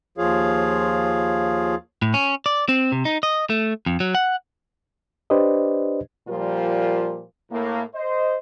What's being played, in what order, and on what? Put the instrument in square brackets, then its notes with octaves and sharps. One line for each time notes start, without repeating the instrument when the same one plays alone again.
[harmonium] D#2 F3 F4 G#4 C#5 F5
[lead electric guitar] A2
C#4
D5
C4
C3
D#4
D#5
A3
F2
F#3
F#5
[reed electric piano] D4 G4 B4 C5 D5 D#5
[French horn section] A#2 F3 G3 F4 A#4
[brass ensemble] A2 A#3
C5 D#5